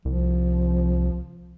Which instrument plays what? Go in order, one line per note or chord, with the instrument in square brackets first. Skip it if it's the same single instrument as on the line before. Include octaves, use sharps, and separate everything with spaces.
[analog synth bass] C2 [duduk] F3